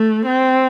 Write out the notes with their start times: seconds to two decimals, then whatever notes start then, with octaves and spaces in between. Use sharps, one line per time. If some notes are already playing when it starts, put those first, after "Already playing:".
Already playing: A3
0.26 C4